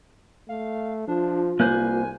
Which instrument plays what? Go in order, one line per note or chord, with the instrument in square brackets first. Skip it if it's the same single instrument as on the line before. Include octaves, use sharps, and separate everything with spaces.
[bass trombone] A3 [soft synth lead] F5
[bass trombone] F3 [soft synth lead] D4 [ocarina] F4
[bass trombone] C2 [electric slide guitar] A#3 B4 C5 [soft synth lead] G#5